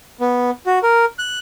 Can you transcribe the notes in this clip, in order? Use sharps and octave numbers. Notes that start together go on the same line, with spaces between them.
B3
F#4
A#4
F#6